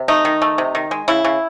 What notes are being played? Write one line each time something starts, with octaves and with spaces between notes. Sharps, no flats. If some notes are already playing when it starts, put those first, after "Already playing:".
Already playing: C3
A3 D#4
D#3
A3
C3
D#3
G#3
C#3 E4
C#3